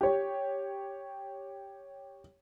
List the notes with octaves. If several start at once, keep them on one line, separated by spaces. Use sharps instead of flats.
G4 C#5